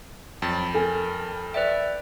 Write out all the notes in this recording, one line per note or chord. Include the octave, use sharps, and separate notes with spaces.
F2 F#3 G5 B5 A6
A4 A#4 G#5
B4 D5 E5 G5